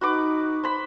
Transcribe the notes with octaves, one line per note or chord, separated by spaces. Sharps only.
D#4 F#4 B4 D6
C5 B5